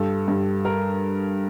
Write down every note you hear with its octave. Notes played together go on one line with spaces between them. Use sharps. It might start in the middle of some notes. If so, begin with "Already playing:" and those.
Already playing: G2 A4
G2
A#4